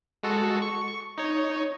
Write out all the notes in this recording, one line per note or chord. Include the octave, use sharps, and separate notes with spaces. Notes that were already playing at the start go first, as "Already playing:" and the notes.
G#3 F#4 A4
C#6
D#4 C#5